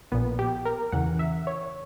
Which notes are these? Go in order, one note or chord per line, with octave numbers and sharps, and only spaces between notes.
A#1 A#2 B3
G4
A#4
E2 C#3 E3 F#5
E5
C#5